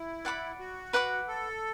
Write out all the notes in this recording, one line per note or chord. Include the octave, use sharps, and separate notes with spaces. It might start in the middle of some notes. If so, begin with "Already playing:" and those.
Already playing: E4
D5 F#5 B5 D6
F#4
B4 F#5 B5 D6
A4